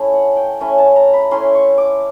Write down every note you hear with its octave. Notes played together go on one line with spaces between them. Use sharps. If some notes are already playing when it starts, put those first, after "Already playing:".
Already playing: A3 C#4 E4
F#5
G5
A3 C#4 E4 G#5
A5
A#5
B5
A3 C#4 E4 C6
C#6
D6